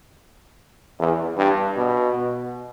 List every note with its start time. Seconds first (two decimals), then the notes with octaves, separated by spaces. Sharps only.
0.99 E2
1.37 G2
1.76 B2